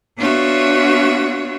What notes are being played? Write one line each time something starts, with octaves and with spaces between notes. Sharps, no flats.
B3 D4 F4 F#4 C#5 E5